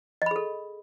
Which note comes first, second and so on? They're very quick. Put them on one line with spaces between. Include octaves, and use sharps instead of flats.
D#5 B5 G#4 A4